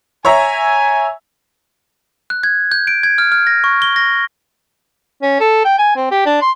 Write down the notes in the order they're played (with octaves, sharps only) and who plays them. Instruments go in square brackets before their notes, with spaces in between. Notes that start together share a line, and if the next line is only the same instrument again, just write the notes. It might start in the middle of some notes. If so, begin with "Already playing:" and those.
[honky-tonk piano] C#5 E5 A#5 [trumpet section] G#5
[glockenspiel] F#6
G#6
G6
D7
G#6
F6
F6
A#6
C#6
G7
A#6
[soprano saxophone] C#4
A4
G5
G#5
C4
G4
D4
C6